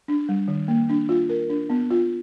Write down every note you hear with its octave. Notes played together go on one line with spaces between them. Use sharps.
D4
G3
D#3
A#3
D4
F4
A#4
D4
B3
F4